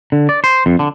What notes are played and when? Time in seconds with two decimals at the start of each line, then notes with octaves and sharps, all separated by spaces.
0.12 D3
0.29 D5
0.44 C5
0.66 F2
0.79 D3